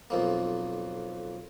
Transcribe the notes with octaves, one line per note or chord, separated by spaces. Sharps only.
B1 F2 A#3